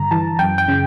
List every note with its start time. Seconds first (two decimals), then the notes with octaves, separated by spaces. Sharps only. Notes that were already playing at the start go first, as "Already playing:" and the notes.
Already playing: G2 D3 A#5
0.11 E3 A5
0.39 F#2 G5
0.58 G5
0.68 C#3